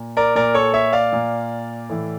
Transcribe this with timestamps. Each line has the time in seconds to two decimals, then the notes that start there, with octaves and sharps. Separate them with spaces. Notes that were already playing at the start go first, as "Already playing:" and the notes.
Already playing: A#2
0.17 A#4 D5
0.36 A#2 A#4 D5
0.54 A4 C#5
0.74 C#5 E5
0.93 D5 F5
1.13 A#2
1.90 A2 E3